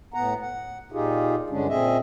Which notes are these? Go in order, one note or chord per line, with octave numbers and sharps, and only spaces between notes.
A2 B3 F#5 A#5
F#5
A#2 D#4 F4 G4 G#4
G2 D3 G#3 C#4 D4
A#2 C4 G#4 D#5 E5